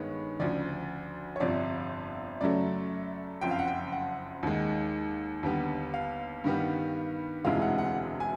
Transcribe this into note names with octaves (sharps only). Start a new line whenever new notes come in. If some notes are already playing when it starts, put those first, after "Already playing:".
Already playing: G2 D#3 G#3 B3 C#5
D2 C#3 F3 D5
C#5
G1 F2 C3 D5
F#2 C#3 F#3 A3 D5
F#1 F2 C#3 G5
F5
F#5
G5
F#5
D#2 D#3 G#3
D#2 D3 G3 B3
F5
G2 D#3 G3 B3
E1 D2 C3 E3 G#3 F5
F#5
F#5
G#5